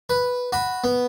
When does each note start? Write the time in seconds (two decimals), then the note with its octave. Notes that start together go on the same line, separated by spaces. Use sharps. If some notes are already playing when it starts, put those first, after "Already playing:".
0.10 B4
0.52 F#4 B5
0.84 B3